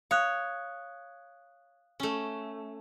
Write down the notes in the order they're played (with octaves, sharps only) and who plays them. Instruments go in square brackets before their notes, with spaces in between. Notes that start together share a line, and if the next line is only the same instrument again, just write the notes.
[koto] C#5 [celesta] F5 D#6 F#6
[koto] A3 C#4